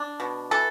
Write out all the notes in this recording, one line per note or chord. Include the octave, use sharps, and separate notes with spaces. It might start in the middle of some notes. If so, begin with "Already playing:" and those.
Already playing: D4
B2
E3 A4